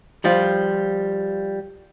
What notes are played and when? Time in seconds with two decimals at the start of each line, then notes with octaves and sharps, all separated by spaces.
0.24 F3 G3 F4